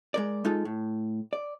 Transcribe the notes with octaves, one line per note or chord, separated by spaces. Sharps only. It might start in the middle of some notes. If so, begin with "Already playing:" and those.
G#3 A#4 D5
G#3 D#4 F4 A4
A2
D5